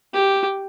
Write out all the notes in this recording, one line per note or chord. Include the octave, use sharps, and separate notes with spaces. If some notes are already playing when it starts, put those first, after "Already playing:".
G4